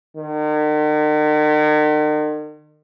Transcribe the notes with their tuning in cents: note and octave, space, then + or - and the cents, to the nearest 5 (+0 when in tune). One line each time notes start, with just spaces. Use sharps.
D#3 -45